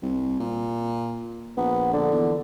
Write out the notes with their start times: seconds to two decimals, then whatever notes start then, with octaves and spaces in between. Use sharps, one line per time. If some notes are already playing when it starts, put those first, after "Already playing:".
0.02 C2
0.40 A#2
1.57 A#1 B3
1.93 D3
2.11 E2